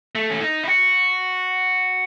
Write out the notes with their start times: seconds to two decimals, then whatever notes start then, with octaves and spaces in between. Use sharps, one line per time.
0.15 A3
0.30 C#4
0.41 D#4
0.64 E4
0.68 F#4